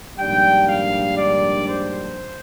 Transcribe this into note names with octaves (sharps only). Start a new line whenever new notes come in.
A#1 G#2 D#3 G3 D4 G5
F5
D5
C5